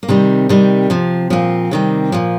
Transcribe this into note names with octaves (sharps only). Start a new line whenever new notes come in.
A#3
C3 D#3 G3 C4
C3 D#3 G3
C3 F3
A#2 F3 C4
C3 D#3 G3
A#2 F3